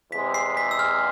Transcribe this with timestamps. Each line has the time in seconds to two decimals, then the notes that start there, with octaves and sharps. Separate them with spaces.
0.12 E2 C3 G#3 B6
0.34 C7
0.57 B6
0.71 E6
0.79 F6